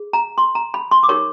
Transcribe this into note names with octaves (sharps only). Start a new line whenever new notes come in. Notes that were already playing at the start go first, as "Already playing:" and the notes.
Already playing: G#4
A#5
C6
A#5
B5
C6
D6
D#4 G4 A#4 C#5 C#6